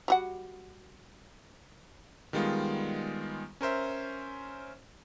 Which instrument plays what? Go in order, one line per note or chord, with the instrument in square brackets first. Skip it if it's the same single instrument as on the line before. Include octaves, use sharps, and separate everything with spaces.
[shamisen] G3 F#4 F#5
[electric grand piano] D#3 G3 G#3 B3 F4
C#4 A#4 C5 E5